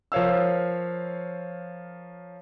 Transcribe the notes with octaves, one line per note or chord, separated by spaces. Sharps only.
F3 A#4 C#5 F5 E6